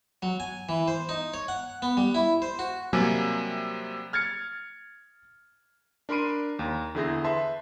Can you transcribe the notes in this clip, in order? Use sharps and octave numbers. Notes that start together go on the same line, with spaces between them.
F#3
G#5
E3
C5
D#4
C#5
F#5
B3
G3
E4
C5
F#4
C3 F#3 G3 A#3 G#5
F6 G#6 A6 C#7
D4 A#4 B5 C6 D7 D#7
D#2 A#5
E2 D3 E4 G#4 G6 A#6
B4 E5 A5 C6